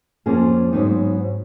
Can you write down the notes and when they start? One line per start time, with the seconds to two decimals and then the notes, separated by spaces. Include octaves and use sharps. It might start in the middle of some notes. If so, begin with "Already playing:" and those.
0.26 F2 F3 A#3 C#4 G#4
0.73 G#2 F#3 B3 D#4